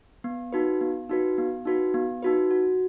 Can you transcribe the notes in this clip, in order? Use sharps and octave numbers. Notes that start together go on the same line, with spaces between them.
B3
D#4 F#4 B4
B3
D#4 F#4 B4
B3
D#4 F#4 B4
B3
D#4 F#4 B4
F#4